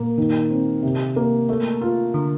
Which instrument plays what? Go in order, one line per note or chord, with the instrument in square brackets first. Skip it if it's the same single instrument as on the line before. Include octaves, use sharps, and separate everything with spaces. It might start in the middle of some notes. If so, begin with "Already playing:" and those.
Already playing: [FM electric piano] A#2 [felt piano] A#3
[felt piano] D#3
C4
C3
A#3
A3
F4
[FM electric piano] D3